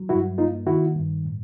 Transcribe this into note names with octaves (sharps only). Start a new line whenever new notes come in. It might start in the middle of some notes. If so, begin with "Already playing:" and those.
Already playing: F#3
G2 E4 F#4
A#3 D#4 F4
D#3 E4 F#4
G2
A2